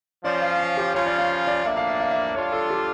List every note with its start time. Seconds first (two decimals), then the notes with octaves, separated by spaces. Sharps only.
0.24 F3 C#4 F4 D5
0.42 F5
0.59 F5
0.77 G4
0.95 C#3 F3 C#4 F4 C#5
1.06 D5
1.18 F5
1.47 D5
1.64 A2 F3 A#3 D4 E5
1.77 F5
1.88 E5
2.00 E5
2.11 E5
2.35 D3 G3 D4 F4 C#5
2.52 A4
2.70 G4